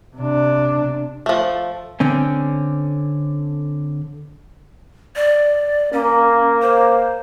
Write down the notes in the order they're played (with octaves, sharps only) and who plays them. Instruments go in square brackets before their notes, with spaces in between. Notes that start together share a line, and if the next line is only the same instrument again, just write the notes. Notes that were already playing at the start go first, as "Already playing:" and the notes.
[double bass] C3 D4
[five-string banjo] F3 A3
[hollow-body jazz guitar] D3 C4 C#4
[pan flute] D5
[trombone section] A#3 [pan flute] C#4
[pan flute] C5